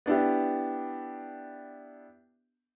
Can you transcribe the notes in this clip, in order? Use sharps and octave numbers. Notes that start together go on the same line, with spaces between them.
B3 D4 E4 G4